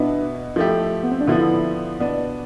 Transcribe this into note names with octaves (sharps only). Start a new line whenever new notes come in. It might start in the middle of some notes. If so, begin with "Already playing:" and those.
Already playing: B2 B3 D4 E4
F3 A3 E4 G4
B3
C4
D4
D3 F3 B3 E4
B2 B3 D4